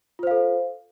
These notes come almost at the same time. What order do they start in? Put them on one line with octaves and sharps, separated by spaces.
F4 C5 F5 A4